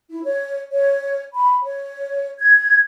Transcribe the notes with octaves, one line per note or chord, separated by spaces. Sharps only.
E4
C#5
C#5
B5
C#5
G#6